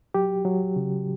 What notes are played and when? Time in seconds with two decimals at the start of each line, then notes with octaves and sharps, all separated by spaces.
0.14 F#3 G4
0.45 F#3
0.76 C#3